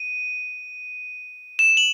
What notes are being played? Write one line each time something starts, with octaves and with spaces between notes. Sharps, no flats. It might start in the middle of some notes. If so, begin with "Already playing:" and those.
Already playing: D#7
E7
F#7